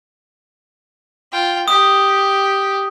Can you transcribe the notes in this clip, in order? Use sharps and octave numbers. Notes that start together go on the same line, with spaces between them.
F4 G5
G4 D#6